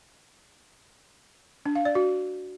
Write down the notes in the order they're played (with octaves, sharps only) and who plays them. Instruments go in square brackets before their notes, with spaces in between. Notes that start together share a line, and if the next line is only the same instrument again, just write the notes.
[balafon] D4
F5
D5
F#4